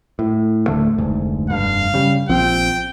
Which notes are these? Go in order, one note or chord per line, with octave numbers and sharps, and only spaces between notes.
A2
D1 D3 A3
F1 D2 G#2
F1 G2 F5
C#3 G3
A#1 F3 C4 G5